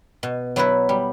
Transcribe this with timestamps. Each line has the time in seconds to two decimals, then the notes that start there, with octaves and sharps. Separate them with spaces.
0.23 B2
0.56 F#3 B3 E4 B4
0.89 G3